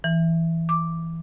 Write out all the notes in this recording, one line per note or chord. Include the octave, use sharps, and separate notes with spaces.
E3
D6